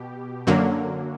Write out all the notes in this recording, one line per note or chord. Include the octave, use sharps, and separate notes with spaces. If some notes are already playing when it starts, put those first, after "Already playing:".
Already playing: B2 G4
F#2 D3 F#3 A#3